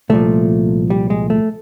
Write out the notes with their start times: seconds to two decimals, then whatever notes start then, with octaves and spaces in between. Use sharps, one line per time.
0.09 C2 A#2 F3 A3
0.90 G3
1.10 G#3
1.30 A3